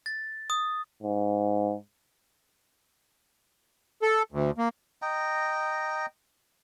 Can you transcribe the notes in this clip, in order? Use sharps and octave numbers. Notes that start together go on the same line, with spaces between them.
A6
D#6
G#2
A4
D2
A#3
D#5 G5 A#5